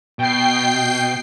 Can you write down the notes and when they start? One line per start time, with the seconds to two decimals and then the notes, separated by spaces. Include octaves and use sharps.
0.19 B2 G5 C7